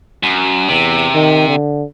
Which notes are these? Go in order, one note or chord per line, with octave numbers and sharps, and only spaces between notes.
F#2
E2 C3
D#3
D3